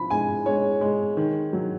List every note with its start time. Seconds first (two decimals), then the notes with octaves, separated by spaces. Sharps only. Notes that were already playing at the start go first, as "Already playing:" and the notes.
Already playing: F3 B5
0.10 G#3 G#5
0.46 G#3 C#5
0.81 G#3
1.17 D#3
1.53 F#3